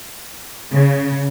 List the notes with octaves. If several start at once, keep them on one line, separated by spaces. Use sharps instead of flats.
C#3